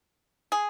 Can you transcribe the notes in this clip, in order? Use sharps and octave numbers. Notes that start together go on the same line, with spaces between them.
G#4